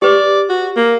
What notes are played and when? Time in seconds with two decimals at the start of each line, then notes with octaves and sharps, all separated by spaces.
0.02 G4 B4 D5 D6
0.49 F#4
0.76 A#3